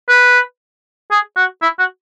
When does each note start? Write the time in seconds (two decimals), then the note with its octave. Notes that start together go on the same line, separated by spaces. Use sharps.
0.09 B4
1.11 G#4
1.37 F#4
1.62 E4
1.79 F#4